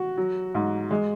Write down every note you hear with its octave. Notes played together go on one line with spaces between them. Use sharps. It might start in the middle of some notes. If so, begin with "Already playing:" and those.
Already playing: F#4
F#3
G#2
G#3